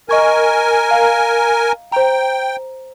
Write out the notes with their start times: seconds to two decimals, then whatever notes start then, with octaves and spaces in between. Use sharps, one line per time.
0.09 A#4 D#5 G#5 C#6 G#6
0.91 F5 A#5
1.92 C5 G5 A#5